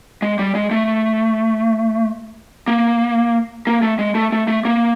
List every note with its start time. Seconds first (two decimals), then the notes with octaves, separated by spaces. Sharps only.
0.22 G#3
0.39 G3
0.55 G#3
0.71 A3
2.67 A#3
3.67 A#3
3.82 A3
3.99 G#3
4.15 A3
4.32 A3
4.48 A3
4.65 A#3